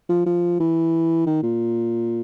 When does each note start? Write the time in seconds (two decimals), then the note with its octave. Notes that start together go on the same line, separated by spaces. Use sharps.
0.09 F3
0.26 F3
0.60 E3
1.27 D#3
1.43 A#2